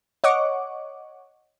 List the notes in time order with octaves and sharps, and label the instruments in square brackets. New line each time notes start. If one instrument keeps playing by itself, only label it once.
[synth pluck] C#5 D#5 F#5 C#6 D6